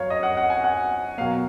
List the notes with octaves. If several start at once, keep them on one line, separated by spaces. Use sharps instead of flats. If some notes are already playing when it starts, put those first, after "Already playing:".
Already playing: F#2 F#3 C#5 F5
D#5
F#5
F#5
G#5
F#5
B2 F#3 A#3 F5